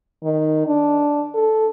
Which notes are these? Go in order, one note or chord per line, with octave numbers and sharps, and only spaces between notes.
D#3
D4
A4